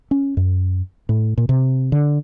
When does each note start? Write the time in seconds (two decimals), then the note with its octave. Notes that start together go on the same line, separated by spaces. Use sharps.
0.11 C#4
0.37 F#2
1.09 A2
1.38 A#2
1.49 C3
1.92 D3